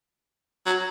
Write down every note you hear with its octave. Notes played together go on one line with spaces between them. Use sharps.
F#3